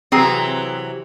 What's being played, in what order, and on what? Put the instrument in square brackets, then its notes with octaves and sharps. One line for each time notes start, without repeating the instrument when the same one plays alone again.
[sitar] C3 E3 F#3 [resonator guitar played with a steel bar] C4 G#4 A#5